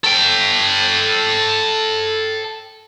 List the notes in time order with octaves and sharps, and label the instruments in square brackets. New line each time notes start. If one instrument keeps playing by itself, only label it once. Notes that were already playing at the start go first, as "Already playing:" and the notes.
[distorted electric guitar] A4 G5